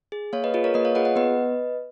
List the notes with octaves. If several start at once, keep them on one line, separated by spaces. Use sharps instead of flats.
G#4
A#3 C#5 F5
B4 D#5
F4 G#4 B4
A#4 C#5
A#3 B4 D#5
C#5 F5
F4 G#4 D#5 F#5
D#5 F#5
B3 B4 D#5